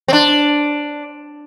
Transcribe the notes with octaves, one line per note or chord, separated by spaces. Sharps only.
C4
D4